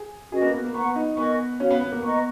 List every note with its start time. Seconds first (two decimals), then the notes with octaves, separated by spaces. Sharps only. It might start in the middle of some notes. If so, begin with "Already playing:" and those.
Already playing: G#4
0.31 C#4 F#4 G#4 B4 D#5
0.42 A#3
0.53 B3
0.64 A#3
0.74 B3 B4 F#5 A#5 C#6
0.96 D#4
1.17 B3 A#4 D#5 G#5 C#6
1.60 C#4 F#4 C#5 F5
1.70 B3
1.81 B3
1.92 A#3
2.02 B3 B4 D#5 A#5 C#6